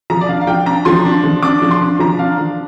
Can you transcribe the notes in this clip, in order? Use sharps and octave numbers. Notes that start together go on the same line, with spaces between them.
F3 A#5
D5
D4 F5
F5
F3 G5
D4 A#5
F3 C6
D4
F3
D4 D6
F3
C6
D4
F3 A#5
D4 F5
F3